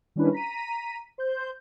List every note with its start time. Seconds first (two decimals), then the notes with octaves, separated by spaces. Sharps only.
0.16 D#3 G3 C#4 D4 E4 B4
0.32 A#5 B6 D#7
1.18 C5 G6